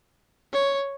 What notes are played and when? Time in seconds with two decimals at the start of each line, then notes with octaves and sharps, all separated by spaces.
0.53 C#5